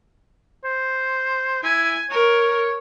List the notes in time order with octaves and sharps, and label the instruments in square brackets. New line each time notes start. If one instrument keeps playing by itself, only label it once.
[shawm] C5
[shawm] E4 [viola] G#5
[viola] A#4 [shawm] C#5